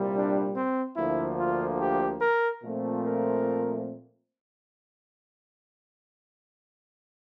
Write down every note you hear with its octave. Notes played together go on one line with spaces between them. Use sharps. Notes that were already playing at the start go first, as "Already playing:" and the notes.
Already playing: C2 A#2 G3
D4
C4
D2 D3 F3 A#3 E4
F4
G4
A#4
A#2 F3 A3 C4
A#4